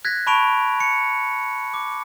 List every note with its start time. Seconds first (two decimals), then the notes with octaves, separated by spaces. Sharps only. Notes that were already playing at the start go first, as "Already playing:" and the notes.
0.05 F#6 G#6 A#6 B6
0.27 A5 B5 C#6 D7 F7
0.80 C#7
1.74 D6